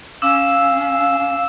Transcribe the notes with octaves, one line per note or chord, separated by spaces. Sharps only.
C#4 F5 D6 E6 E7